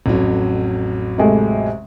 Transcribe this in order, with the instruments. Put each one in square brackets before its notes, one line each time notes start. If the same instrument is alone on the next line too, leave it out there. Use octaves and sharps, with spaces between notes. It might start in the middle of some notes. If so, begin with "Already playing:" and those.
[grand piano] A1 F2 F#3
[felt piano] C3 G#3 A3